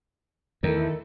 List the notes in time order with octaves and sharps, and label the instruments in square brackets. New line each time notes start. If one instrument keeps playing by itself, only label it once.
[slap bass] E2 [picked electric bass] D#3 [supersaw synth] A3 E4 A4 [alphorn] A#4